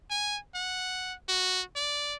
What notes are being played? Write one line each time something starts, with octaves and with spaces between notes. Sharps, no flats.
G#5
F#5
F#4
D5